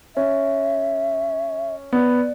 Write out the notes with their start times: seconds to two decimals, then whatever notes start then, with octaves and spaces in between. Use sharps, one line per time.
0.16 C#4 E5
1.92 B3 D5